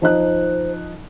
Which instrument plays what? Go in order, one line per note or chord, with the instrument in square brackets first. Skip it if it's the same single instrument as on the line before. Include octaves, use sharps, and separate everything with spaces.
[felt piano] F3 D#4 F#6 [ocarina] C5